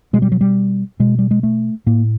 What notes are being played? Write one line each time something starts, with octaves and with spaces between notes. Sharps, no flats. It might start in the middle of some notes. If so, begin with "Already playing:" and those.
B2 G#3
G3
F#3
G3
B2 G#3
G3
G#3
A3
A2 A#3